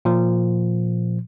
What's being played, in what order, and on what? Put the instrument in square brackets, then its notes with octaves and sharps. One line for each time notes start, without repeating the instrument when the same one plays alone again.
[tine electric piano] A#2 F3